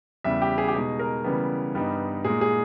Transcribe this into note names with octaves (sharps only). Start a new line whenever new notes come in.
E2 C#3 G3 E5
G4
G#4
G4
B2 G#3 D#4 G#4
A#4
C#3 E3 G3 B3
G2 G3 B3 D#4
A#2 G#3 D#4 G#4
G#4